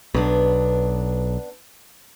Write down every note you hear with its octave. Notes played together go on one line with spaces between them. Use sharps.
B1 B3 D4